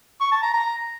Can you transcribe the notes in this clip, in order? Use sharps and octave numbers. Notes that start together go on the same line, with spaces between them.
C#6
A5
A#5
A#5